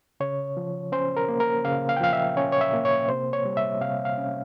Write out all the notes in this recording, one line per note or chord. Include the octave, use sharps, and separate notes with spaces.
C#3 C#5
F3
C#4 C5
A#4
A#3
A#4
C#3 F5
F5
G5
F3 F5
E5
C#4 C#5
C#5
E5
A#3
C#5
C3 C5
C#5
G3
E5
C3 F5
F5
C#4